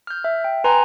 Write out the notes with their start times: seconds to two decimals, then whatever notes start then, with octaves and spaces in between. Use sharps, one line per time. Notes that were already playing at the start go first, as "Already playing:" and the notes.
0.07 F6 G6
0.24 E5
0.44 G5
0.64 B4 G#5 A#5 C6